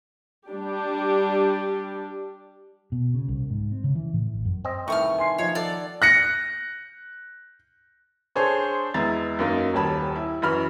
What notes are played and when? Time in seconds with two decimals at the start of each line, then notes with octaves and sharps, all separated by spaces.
0.49 G3 D4 G4
2.92 B2
3.14 C#3
3.28 C2
3.50 G#2
3.72 C4
3.84 C#3
3.95 E3
4.13 A2
4.33 A1
4.45 F#2
4.65 C4 D#5
4.88 C2 D#3 E3 A3 C#6 D#6 F6
5.19 G#5 C6 C7
5.38 F3 D#4 C#5
5.55 A4 D5 F#5
6.02 F#6 A#6 C#7
8.36 D4 G#4 A4 C5 C#5
8.94 E2 G#3 E4 A#5 A6
9.39 F#2 A#3 D#4
9.73 D#1 D#2 C#5 A5 B5
10.16 E4
10.42 F#2 E3 B5 F6